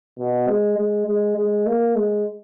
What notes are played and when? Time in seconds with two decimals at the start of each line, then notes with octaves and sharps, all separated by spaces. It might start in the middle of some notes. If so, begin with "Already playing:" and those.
0.18 B2
0.48 G#3
0.78 G#3
1.07 G#3
1.36 G#3
1.67 A#3
1.96 G#3